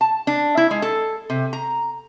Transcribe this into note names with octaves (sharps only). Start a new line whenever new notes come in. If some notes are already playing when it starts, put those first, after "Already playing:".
A5
D4
E4
G#3
A4
C3
A#5